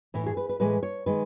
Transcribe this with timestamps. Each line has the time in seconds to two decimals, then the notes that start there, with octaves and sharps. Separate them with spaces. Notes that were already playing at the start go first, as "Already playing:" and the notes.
0.14 A2 E3 A3 E4
0.26 G#4
0.37 B4
0.49 B4
0.60 A2 E3 G#3 B4
0.83 C#5
1.06 D#3 G#3 B4